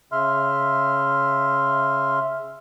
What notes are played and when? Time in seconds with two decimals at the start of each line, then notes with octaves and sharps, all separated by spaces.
0.12 C#3 E5 C6 F6